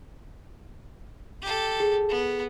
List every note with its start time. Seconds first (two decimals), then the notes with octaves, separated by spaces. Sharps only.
1.42 G4 A4
1.80 G#4
2.09 B3